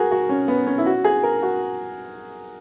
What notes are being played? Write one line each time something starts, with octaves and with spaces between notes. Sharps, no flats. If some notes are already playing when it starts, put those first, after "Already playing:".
Already playing: F#4 G#4 A#4
F#4
C#4
B3
C#4
E4
F#4
G#4
A#4
F#4